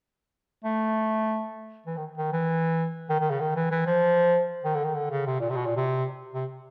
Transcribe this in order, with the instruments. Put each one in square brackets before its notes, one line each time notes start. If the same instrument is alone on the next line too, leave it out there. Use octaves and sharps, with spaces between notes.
[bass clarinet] A3
E3
D#3
D#3
E3
D#3
D#3
C#3
D#3
E3
E3
F3
D#3
D3
D#3
D3
C#3
C3
A#2
C3
B2
A#2
C3
C3